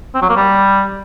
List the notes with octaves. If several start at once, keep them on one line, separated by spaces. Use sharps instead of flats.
C4
F#3
A#3
G3